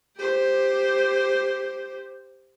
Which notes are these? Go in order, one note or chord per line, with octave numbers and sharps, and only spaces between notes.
G4 C5